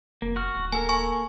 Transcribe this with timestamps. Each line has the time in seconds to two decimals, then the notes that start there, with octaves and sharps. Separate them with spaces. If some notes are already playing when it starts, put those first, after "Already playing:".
0.22 F1 A#3
0.36 F#4 C#6 F6
0.56 D1
0.72 A#3 A4 A#4 G#5
0.89 G#5 C#6